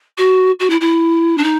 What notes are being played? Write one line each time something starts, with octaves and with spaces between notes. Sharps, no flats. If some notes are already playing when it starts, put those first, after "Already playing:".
F#4
F#4
E4
E4
D4
D#4